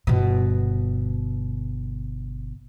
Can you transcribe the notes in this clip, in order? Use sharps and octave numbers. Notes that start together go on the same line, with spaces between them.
G1 B2